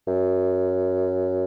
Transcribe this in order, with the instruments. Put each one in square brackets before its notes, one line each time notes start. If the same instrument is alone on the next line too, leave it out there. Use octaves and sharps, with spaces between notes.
[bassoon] F#2